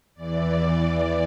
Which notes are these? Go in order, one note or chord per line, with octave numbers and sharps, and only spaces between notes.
E2 E3 D5